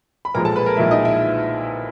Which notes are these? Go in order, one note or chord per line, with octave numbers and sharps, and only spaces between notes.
B5
B1 A#2 F3 G#3 A#4 A#5
A4 A5
B4 B5
A#4 A#5
B1 A#2 F3 G#3 E4 E5
D#4 D#5
E4 E5